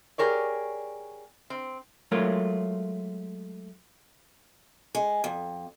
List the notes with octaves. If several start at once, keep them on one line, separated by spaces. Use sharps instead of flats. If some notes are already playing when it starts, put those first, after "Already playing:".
G4 G#4 A#4 C#5 D5
C4
F#3 G#3 A3 F4 A#4 C#5
G#3
F2